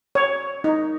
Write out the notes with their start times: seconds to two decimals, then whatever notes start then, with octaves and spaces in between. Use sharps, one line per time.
0.15 C#5
0.64 D#4